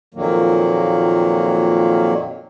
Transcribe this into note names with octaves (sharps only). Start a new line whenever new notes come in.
F2 A#2 D#3 F#3 A#3